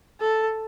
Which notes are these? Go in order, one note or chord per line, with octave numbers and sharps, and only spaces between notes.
A4